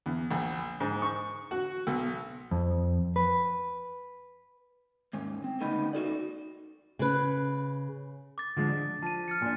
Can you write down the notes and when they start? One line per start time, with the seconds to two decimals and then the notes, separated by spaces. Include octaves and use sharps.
0.06 E2
0.31 A#1
0.80 G#2
1.02 C#6
1.51 F#4
1.87 B1
2.51 F2
3.16 B4
5.13 D#2 G#2 C#4
5.44 C4
5.60 D2 C#3 G#3 B3 D#4 B5
5.93 D#4 F#4 A4 D5
6.99 C#3 B4
8.38 D6 A6
8.57 D3 F3 G#3
8.69 D4
9.02 F3 A5 D#7
9.28 F6 A6 C#7
9.42 A#2 D4 G#5